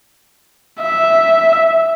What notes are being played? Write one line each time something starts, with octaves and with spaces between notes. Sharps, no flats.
E5